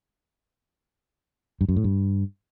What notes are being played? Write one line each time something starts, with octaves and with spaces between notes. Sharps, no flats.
G2
F#2
A2
G2